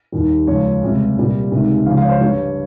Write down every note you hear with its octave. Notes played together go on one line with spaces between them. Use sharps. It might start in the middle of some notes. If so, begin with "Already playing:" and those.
D#2 D#3 G3
C#2 C#3 F3 C#5
C#2 C3 G3
C2 A#2 G3
C#2 C3 D#3
C#2 C#3 F3 F5
F5
C#5
C5
G2 G3 C#5